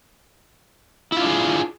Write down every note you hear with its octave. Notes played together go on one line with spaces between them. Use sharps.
D4 E4 F4 G#4